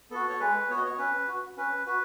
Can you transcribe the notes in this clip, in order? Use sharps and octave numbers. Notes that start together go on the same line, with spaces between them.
B3 F#4 A4
C#5
G#3 B4
B3 F#4 C#5
D#5
C#5
C#4 B4
F#4
C#4 B4
F#4 B4